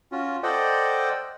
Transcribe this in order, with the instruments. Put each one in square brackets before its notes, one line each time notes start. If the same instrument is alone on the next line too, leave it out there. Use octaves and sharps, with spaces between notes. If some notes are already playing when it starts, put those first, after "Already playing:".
[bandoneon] C#4 F4 F#4
A4 C5 D5 D#5 F#5 G5